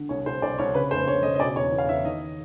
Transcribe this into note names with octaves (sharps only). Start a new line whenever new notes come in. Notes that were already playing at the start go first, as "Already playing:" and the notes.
Already playing: D3
C2 C#5
C2 C5
C2 D5
C2 C#5
C#3 B4
F1 C5
F1 C#5
C#3 D#5
D#5
B2 D5
E2 C#5
E2
F5
E2 E5
D#3 D#5